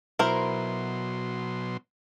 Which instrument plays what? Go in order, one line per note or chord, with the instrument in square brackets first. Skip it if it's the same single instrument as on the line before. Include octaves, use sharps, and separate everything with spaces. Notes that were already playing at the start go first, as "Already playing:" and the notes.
[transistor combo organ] B2 F#3 C6 [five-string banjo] E4 A#4 C5